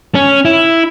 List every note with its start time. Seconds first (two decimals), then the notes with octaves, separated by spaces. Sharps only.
0.15 C#4
0.45 E4